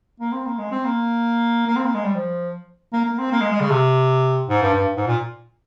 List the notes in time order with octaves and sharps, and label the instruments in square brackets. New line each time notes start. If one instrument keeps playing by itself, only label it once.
[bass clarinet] A#3
C4
A#3
G#3
C4
A#3
A#3
C4
A#3
G#3
G3
F3
A#3
A#3
C4
A#3
G#3
G#3
C#3
C3
G#2
G2
G2
G#2
A#2